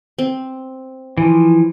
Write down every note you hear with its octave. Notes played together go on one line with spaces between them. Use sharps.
C4
E3 F3